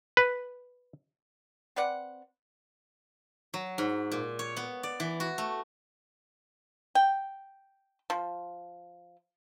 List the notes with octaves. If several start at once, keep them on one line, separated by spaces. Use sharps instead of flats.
B4
C4 B4 D5 F#5
F#3
G#2
A#2
C#5
B3
D5
E3
F#4
A3
G5
F3